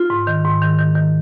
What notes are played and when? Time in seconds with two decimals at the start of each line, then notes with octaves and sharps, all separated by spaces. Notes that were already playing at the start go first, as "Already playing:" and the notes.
Already playing: F4
0.10 G#2
0.27 D#3
0.44 G#2
0.62 D#3
0.79 D#3
0.95 D#3